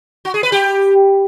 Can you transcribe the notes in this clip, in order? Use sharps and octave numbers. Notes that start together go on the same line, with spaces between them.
F#4
G#4
B4
G4